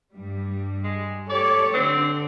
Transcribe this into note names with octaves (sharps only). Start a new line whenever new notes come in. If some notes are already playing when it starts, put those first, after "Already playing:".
G2 G3
G#3
G4 A4 C#5 D5
D3 C4